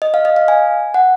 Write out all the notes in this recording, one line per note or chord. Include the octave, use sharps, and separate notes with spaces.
D#5
F5
D#5
F5
G#5
F#5